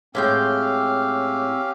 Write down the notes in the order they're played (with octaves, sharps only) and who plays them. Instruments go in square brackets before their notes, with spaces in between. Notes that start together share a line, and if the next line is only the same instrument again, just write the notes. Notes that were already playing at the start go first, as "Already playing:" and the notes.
[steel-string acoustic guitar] A2 G#3 G5 [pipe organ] C4 E6 [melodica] C#4 G4 F5